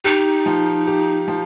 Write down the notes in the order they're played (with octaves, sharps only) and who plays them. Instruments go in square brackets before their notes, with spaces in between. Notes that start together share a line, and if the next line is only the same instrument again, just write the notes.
[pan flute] D#4 [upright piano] G4
[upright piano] F3
G4
F3